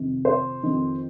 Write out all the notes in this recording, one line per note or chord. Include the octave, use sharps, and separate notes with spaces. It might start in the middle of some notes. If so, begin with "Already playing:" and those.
Already playing: F2 C3 D#3
C5
F2 D#3